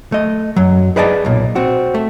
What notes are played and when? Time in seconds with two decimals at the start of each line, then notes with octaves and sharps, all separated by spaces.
0.12 A3 D#5
0.56 F#2 F#3
0.96 G#4 B4 D5 D#5 G5 A5
1.25 B1 A#2
1.55 C4 F#4
1.95 A3